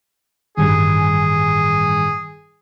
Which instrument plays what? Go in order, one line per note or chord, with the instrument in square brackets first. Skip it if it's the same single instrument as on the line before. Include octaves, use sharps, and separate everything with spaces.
[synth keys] A1 G2 G#5 [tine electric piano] D#3 [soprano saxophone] G#4